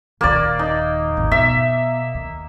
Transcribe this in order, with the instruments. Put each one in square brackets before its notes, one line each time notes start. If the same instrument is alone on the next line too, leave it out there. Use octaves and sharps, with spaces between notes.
[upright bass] D#1 D#2 [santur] A#3 D5
[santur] D#4
[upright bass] G#1 D#2
[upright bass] B2 [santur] E5
[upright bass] D#2